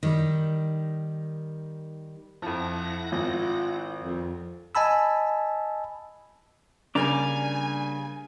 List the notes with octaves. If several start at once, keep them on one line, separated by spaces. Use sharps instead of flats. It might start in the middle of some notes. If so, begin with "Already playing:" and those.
D#3 G3
F2 F3 E4 F#5 A#6
G#1 F4
F2
D#5 G#5 A5 B5 E6
C#3 G3 A#3 D4 G#5 A#5 D6